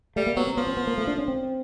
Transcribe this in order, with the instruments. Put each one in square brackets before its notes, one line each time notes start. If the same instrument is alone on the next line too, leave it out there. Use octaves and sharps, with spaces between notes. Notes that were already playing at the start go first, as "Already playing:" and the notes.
[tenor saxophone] G3 [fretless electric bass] A3
[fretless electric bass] A#3
[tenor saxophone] F#3 [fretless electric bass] B3
[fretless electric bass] C4
[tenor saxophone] F3 [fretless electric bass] B3
[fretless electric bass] C4
B3
A#3
A3
D4
C#4
C4